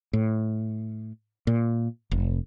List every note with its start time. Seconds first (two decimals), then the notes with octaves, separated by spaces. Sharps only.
0.13 A2
1.47 A#2
2.11 F1